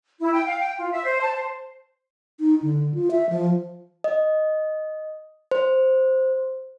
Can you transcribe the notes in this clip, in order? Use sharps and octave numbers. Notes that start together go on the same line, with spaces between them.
E4
G5
F5
G5
F4
E5
C5
A5
C5
D#4
D3
F4
E5
F3
D#5
C5